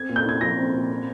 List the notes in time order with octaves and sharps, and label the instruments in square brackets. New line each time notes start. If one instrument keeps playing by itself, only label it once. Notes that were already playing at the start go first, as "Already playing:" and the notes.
Already playing: [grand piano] C4 [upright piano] G#6
[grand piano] A#2
[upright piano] G6
[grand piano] E4 [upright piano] G#6
[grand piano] F3 [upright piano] A#6
[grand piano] C4
A#2
C4